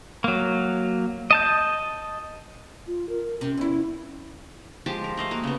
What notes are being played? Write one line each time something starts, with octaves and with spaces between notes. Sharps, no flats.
F#3 A#3
D#5 A5 G6
F4
A#4
C3 C#4
E2 E4
F3 G#3 G4 A5
A#4
A3 D#5 F5
A#3 F#4 A#4
C#3 B3